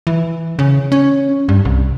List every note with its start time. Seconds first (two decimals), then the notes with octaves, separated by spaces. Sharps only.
0.07 E3
0.59 C#3
0.92 C#4
1.49 G2
1.65 C2